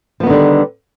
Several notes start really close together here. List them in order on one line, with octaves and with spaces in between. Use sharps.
F3 B3 D#3 D3 G3